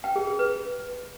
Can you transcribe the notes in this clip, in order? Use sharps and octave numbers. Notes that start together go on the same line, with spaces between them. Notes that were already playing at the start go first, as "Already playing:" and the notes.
G5
G#4
G#4
B4